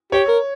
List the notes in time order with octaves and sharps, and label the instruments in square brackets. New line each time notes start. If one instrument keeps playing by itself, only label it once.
[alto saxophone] G4 [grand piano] C#5
[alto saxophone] A#4